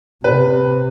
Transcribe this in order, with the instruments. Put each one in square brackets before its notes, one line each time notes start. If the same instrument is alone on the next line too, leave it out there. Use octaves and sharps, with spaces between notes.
[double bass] C3 [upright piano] B4